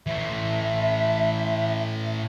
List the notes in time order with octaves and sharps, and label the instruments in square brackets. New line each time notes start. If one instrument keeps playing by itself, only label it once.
[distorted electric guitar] A2 E3 [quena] E5